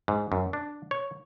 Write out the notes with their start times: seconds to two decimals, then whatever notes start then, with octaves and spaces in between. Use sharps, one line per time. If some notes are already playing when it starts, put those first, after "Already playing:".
0.08 G#2
0.32 F#2
0.53 D4
0.91 C#5